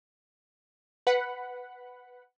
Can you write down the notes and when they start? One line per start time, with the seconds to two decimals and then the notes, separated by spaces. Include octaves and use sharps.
1.07 B4 F#5 B5